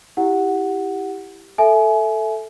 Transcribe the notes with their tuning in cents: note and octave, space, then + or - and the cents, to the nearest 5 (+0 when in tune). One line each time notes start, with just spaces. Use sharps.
E4 +0 G4 +0 F#5 +0
A4 +0 E5 +0 G#5 +30